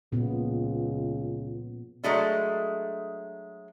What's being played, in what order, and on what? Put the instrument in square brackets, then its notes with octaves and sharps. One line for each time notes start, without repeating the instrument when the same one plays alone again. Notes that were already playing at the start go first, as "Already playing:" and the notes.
[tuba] C#2 [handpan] A#2 B3
[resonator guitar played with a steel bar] F#3 G#3 A3 D4